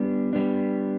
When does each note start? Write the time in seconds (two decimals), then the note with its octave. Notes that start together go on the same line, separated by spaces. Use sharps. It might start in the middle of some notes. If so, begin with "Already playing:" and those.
Already playing: G3 B3 D4
0.33 G3 B3 D4